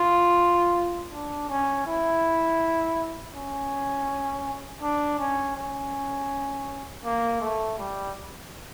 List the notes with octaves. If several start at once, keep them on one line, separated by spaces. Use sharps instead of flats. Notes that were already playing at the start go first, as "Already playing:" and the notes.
Already playing: F4
D4
C#4
E4
C#4
D4
C#4
C#4
A#3
A3
G3